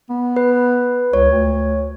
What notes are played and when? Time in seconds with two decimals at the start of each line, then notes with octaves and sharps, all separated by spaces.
0.10 B3
0.36 B4
1.13 C#2 C#5
1.31 D2